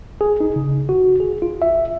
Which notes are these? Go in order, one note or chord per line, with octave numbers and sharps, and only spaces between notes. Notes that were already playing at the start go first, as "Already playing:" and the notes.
G#4
D#4
C#3
F#4
G#4
F4
E5